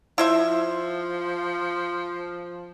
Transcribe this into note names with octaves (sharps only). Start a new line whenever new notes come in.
F3 E4 C5 E5